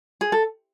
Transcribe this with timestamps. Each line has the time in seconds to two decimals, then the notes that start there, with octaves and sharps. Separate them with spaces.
0.21 G#4
0.32 A4